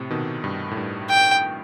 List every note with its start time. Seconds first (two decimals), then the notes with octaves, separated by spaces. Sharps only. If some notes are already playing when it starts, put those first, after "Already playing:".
Already playing: A2 C3
0.10 B2 D#3
0.44 G2
0.71 A2
0.77 G2
1.10 G5